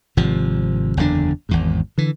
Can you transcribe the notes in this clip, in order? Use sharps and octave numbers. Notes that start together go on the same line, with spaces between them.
G#1 C3 F3
F#1 E2 D3 D4
G#1 E2 G#2
D3 E3